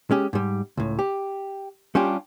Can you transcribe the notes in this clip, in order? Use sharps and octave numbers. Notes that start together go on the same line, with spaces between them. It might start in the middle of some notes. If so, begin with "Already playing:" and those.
G#3 C#4 G4
G#2 G3
C#2 A2
G4
G3 C#4 D4 F4 G4